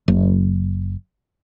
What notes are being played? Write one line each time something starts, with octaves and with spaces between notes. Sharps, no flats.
F#1